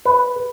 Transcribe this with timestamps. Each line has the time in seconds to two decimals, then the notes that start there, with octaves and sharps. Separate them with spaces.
0.05 B4